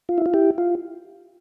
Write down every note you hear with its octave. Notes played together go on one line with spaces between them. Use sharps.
F4
E4
F4
E4 G4
F4